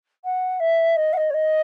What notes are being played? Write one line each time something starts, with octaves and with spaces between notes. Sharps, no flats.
F#5
E5
D#5
F#5
D#5
C#5
D#5